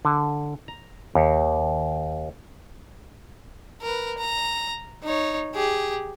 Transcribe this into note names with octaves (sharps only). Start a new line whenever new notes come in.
D3
A#5
D#2
A#4 B4
A#5
D#4 C#5
G4 G#4